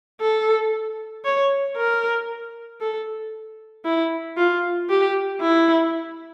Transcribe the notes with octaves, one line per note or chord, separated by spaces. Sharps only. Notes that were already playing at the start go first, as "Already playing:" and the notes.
A4
C#5
A#4
A4
E4
F4
G4
E4